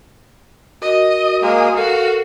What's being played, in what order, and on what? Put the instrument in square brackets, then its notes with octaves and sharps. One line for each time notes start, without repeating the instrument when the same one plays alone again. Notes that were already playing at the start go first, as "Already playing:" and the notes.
[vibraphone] F#4 A#4 [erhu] D#5
[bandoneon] G#3 A#3 [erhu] G#4
[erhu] F#4 [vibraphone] A4 A#4 [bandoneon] F5